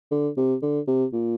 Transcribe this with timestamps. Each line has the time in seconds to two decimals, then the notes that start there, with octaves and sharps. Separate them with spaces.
0.11 D3
0.37 C3
0.62 D3
0.87 C3
1.13 A#2